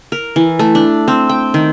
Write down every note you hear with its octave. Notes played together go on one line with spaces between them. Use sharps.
A#4
E3
A3
D4
C4
G5
D#3